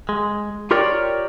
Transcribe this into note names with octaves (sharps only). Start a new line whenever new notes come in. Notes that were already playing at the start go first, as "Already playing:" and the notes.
G#3
F4 G4 A#4 C#5 D5 G5